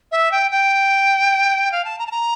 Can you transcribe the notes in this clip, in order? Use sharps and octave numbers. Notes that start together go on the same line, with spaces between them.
E5
G5
G5
F5
A5
A#5
A5
A#5